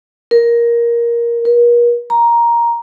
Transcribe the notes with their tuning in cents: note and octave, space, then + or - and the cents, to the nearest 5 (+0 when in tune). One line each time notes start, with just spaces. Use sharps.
A#4 +15
A#4 +40
A#5 +10